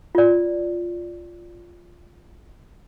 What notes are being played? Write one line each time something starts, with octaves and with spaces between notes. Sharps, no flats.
F4 D5